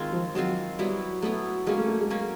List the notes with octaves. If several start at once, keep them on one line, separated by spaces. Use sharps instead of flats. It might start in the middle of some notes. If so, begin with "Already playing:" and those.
Already playing: D#3 G#3 C4 F4
F3
D#3 F#3 G#3 C4 F4
F#3 G3 B3 E4
F#3 A3 B3 E4
F#3 G#3 A#3 C#4
A3
A3
G#3
F#3 A#3 C#4